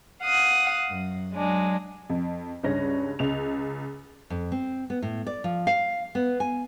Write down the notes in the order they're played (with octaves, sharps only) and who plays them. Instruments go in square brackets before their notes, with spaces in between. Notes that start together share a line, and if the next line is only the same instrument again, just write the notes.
[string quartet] F5 F#5 D#6
F#2
F#3 G#3 D4
[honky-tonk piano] F2
C#2 G2 C#4 A#6
C#2 F7
[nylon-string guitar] F2
C4
B3
A2
D5
F3
F5
B3
G#5